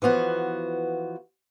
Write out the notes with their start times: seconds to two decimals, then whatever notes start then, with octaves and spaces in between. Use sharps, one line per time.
0.02 E3 F3 B3 F#4